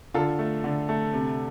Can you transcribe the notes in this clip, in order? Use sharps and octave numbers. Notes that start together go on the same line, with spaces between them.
D3 F4 A4
A3
D3
A3
C3